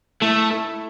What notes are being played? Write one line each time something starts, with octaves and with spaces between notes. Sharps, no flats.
A3 E4 A4
E4 A4